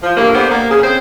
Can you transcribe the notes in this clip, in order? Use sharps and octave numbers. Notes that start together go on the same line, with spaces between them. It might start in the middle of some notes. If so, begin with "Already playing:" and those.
F3
G2 A3 A#3
B3 C4 D4 G4 C5
A#3
C#3 G#4
C4 C5